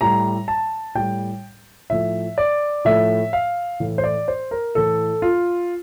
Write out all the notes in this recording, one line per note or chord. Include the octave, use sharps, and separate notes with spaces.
A2 G3 A#5
A5
A2 G3 G5
A2 F3 A3 E5
D5
A2 F3 A3 E5
F5
A2 E3 A3
C5
D5
C5
A#4
A2 E3 A3 A4
F4